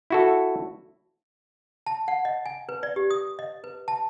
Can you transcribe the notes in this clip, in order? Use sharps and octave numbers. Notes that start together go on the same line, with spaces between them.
E4 F#4 A4
A5
F#5
D#5
G#5
B4
D5
G4
D#6
D#5
B4
A5